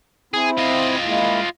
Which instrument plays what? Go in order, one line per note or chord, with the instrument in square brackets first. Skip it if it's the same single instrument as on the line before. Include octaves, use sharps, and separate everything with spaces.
[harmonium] C4 E4 [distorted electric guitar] G#4
[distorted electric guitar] F4 D#5
[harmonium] G#3 A#3 E4